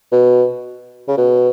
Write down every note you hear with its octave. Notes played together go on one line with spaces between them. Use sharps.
B2
C#3
B2